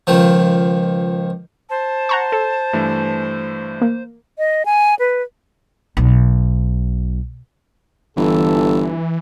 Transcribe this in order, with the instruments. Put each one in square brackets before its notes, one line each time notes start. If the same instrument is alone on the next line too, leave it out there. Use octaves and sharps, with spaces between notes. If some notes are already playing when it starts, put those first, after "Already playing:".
[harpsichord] C#2 D#3 F3
[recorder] C5 [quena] A5
[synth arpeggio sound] F#5 A#5 C#6
A4
[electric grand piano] G2 E3 A3
[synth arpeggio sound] A#3
[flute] D#5
G#5
B4
[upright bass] B1
[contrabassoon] G1 [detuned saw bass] E3 [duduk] A4